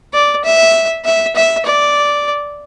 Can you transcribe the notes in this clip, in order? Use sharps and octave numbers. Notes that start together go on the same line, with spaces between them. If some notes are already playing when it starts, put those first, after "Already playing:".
D5
E5
E5
E5
D5